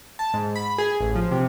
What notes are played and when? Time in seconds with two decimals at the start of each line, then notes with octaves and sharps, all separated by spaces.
0.19 A5
0.34 G#2
0.56 B5
0.78 G#4
1.00 A1
1.15 F3
1.31 C3